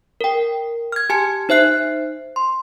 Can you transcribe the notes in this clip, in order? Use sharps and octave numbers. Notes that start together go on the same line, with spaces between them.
A#4 G5
F6 G#6
G4 G#5 A5 G#6 C#7
D#4 C5 E5 F#6 C7
C6